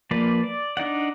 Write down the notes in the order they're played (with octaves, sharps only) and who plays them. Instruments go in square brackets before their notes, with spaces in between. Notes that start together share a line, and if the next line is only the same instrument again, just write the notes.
[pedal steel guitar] F3 A#3 B4 D5
D5
D4 D#4 D5 F#5